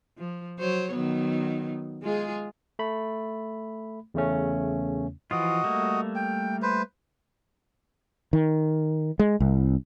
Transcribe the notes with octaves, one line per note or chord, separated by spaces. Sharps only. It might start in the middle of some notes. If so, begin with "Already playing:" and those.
F3
F#3 C5 C#5
D#3 F#3 B3
G#3 F4 G#4
A3 B5
E2 C#3 A3 C#4
E3 F3 F4 F#4 D#5
G3 A3 A#3
G5
B4 C5
D#3
G#3
C2